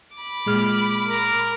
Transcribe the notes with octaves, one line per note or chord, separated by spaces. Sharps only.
B5 D6
A#2 G#3 F6
A#4